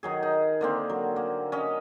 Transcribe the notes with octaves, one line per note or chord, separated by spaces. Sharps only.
D#3 F#3 G#4
D#4 G#4
D3 A#3 C4
F#3
A#3
C#4 D#5